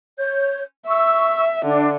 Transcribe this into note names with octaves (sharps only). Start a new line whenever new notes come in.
C#5 G6
E5 C#6 E6
D3 D4